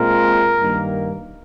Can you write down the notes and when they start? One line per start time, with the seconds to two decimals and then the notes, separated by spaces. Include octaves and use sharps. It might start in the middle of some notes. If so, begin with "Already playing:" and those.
Already playing: A#2 G#3 C4 F4 A#4
0.59 G2 D#3 A#3